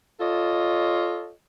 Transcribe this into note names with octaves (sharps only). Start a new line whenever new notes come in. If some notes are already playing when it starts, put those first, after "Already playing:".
F4 A4 C#5 D#5